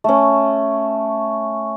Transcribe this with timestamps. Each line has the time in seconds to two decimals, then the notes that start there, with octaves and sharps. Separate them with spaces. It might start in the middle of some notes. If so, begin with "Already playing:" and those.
0.04 A3 C#4